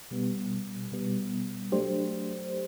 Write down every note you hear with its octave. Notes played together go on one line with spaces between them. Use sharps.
B2 G3 B3
B2 G3 B3
F#3 A3 D4 G4 C5